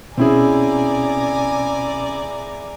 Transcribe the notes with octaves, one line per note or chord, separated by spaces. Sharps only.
B2 C4 C#4 E4 G#4 D5 G#5 A#5